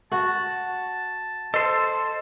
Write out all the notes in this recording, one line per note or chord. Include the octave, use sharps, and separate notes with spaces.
F#4 A5
A4 C5 D#5